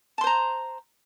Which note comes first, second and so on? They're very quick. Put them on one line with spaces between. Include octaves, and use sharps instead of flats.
A5 C6 C5 A#5